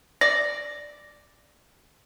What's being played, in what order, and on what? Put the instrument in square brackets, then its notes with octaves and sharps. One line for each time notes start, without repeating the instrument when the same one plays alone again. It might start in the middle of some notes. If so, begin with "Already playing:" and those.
[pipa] D5 [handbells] A#6